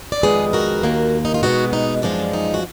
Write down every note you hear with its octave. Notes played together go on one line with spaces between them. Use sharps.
D5
F2 D#3 G#3 B3 G#4 B4
F#4 A#4
D#2 D#3 A#3
D#4
F4
B2 G#3 B3 D#4 F#4
D#4
F#2 F3 G#3 D4
D#4
F#4